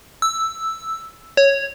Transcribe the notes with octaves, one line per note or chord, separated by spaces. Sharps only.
E6
C#5